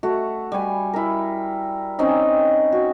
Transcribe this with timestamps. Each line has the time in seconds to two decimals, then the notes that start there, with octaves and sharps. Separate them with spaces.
0.03 A3 F#4
0.52 G3 G#5
0.93 E4 A#4
1.99 C4 C#4 D#4
2.72 F#4